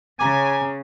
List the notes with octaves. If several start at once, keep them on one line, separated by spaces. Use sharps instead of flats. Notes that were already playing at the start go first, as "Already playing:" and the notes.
C#3 G#5 A#5 D6